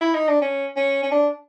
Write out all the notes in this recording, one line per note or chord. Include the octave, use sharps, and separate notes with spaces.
E4
D#4
D4
C#4
C#4
C#4
D4